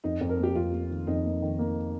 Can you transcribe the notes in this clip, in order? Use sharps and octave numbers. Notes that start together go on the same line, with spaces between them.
F2 D#4
F2
A#4
A#3 G4
F2 F4
A#3
D#3
F2 D#4
A#3
D#3
A#3